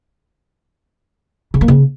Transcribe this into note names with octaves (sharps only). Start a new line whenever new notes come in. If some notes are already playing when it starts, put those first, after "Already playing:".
C#3
A#3
C#3